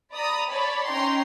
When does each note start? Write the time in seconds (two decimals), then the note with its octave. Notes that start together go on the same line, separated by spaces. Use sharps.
0.13 D5 A#5 B5 D#6
0.50 C#5 D5 A5 B5
0.87 C#4 D#4 C#5 G5 A#5 C6